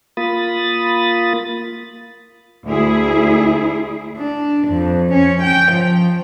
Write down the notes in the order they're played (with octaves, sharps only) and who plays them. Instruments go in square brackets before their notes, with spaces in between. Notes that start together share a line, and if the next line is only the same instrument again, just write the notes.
[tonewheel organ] A#3 F4 B5 D#6 A6
[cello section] D2 E4 G#4
[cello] D4
F2
C#4
G5
F3